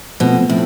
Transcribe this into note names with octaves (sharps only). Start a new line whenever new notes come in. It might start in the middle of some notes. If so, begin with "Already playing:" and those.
B2 F3 A3 C4
A2 F3 A3 C4